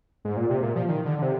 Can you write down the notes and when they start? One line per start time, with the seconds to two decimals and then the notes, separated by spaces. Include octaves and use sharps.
0.25 G#2
0.37 A#2
0.50 C3
0.63 A#2
0.76 F3
0.88 D#3
1.05 D3
1.19 D3
1.22 C3